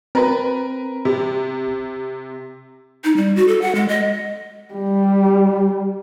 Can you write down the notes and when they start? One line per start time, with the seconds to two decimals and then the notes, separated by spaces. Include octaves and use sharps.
0.15 C4 A#4 B4 B5
1.05 C3
3.04 D#4
3.17 G3
3.36 F#4
3.48 A4
3.61 F#5
3.75 G#3
3.88 D#5
4.74 G3